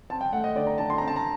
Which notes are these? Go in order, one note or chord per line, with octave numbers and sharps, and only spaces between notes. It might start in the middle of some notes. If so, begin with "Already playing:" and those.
C4 A5
G5
A3 F#5
D#5
D3 D5
A#5
D3 A5
C6
C4 A#5
A5
A#5